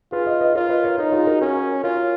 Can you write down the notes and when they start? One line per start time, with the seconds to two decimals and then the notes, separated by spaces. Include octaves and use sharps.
0.12 F4 G#4 B4
0.26 B4 D#5
0.41 B4 D#5
0.55 F4 A#4 C#5
0.69 B4 D#5
0.84 A#4 C#5
0.98 D#4 A#4 C#5
1.12 F4 G#4
1.27 F#4 A#4
1.41 C#4 F#4 A#4
1.83 F4 A#4 C#5